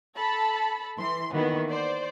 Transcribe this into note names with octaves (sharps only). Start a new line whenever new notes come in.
A4 A5 B5
E3 C6
D#3 E3 A#3 B3 F#4
C5 D5